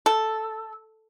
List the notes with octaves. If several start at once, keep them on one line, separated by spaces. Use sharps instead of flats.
A4